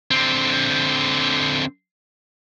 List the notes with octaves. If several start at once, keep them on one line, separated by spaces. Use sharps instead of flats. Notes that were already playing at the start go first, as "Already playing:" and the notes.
D3 C4